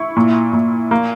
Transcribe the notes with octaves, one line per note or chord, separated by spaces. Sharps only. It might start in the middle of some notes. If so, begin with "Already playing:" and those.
Already playing: E4 C#6
A#2
A#2
A#3